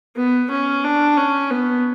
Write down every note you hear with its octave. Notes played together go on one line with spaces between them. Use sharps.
B3
C#4
D4
C#4
B3